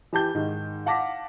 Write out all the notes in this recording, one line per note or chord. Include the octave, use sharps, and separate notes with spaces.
E3 G4 A5 G6
G#2 D#3
F5 F#5 A5 D6 A#6 B6